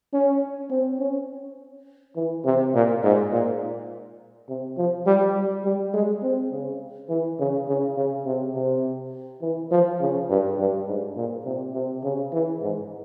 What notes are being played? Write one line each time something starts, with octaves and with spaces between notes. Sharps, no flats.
C#4
C4
C#4
E3
C3
A#2
G#2
A#2
C3
F3
G3
G3
G#3
C4
C#3
E3
C#3
C#3
C#3
C3
C3
E3
F3
C#3
G2
G2
G#2
A#2
C3
C3
C#3
E3
G#2